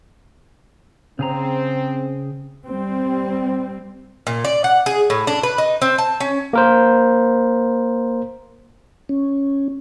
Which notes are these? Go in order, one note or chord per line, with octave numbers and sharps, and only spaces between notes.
C#3 C4 G#4 A#5
G3 C4
A#2
D5
F#5
G#4
A2
D4
B4
D#4
C4
A5
C#4
A#3 A#4 C5
C#4